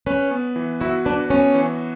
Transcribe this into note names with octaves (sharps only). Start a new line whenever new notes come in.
C#4 B4
B3
E3
E4 F#4
D4 B4
B3 C#4
E3